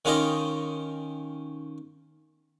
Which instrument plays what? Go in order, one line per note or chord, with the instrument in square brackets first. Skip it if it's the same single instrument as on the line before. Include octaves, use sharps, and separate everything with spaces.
[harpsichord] D#3 C#4 F4 G4 D#5